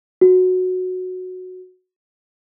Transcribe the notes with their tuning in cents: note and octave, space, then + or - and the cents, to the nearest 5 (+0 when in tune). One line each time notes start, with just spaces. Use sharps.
F#4 -10